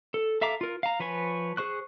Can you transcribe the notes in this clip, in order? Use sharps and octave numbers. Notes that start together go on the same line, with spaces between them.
A4
A4 E5 F5 A#5 D6
F4 A#4
F5 A#5
F3 B4 C#5 G#5
G#4 C5 C#6 F#6